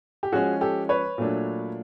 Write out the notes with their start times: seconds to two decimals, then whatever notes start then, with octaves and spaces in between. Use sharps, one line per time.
0.23 G4
0.32 F3 G#3 C#4 F#4 G#4
0.61 G4 A4
0.89 B4 C#5
1.18 A#2 F#3 A3 D4